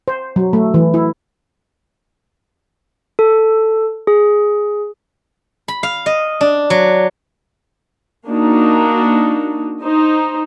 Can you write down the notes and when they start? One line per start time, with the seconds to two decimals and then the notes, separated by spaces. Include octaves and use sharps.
0.08 C5
0.36 F#3
0.53 A3
0.74 E3
0.94 E4
3.19 A4
4.07 G#4
5.68 B5
5.83 F5
6.06 D#5
6.41 D4
6.70 F#3
8.28 A#3 D4 D#4 F#4
9.82 D#4 C5